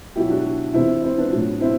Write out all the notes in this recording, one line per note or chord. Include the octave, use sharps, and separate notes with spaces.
B2 F#3 E4 G4
D4 F#4
C3 E3 C4 E4
C4 E4
B3 D4
A2 F#3
C4 E4